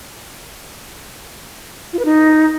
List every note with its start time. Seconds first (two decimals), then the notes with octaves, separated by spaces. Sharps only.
1.93 F4
1.99 B4
2.05 D#4